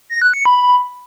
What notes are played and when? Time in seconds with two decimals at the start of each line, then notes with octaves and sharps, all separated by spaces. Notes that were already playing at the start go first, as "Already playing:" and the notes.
0.10 A#6
0.22 F#6
0.34 C#7
0.45 B5